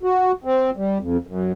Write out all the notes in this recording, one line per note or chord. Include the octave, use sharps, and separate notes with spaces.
F#4
C4
G3
F2
F#2